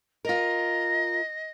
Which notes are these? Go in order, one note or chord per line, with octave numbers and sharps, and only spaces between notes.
F4 A#4 D#5